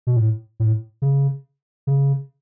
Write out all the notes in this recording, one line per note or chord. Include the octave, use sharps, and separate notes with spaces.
B2
A2
A2
C#3
C#3